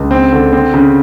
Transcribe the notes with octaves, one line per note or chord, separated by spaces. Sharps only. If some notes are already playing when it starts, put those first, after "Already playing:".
Already playing: C#2
C4
D3
C4
C#3